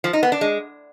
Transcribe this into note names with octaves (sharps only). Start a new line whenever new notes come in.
F3
D#4
B3
D4
G#3